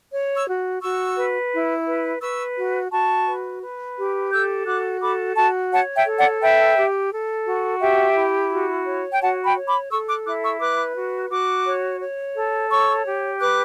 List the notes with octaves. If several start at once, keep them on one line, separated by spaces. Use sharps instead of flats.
C#5
C#6 E6
F#4
F#4 C#6 E6
B4
E4
B4
B4 C#6 E6
F#4
F#4 A5 C#6
B4
B4
G4
A4 E6 G6
F#4 D6 F#6
A4 B5 D6
F#4 A5 C#6
C#5 F#5 A5
E5 G5
A4
D5 F#5
B4 E5 G5
G4
A4
F#4
G4 E5 G5
E4
F#4
C#5
G5
F#4 F#5 A5
G5 B5
C#5
B5 D6
A4 C#6 E6
D6 F#6
E4 D6 F#6
C#6 E6
B4 D6 F#6
F#4
F#4 D6 F#6
C#5
C#5
A4
C#5 C#6 E6
G4
B4 D6 F#6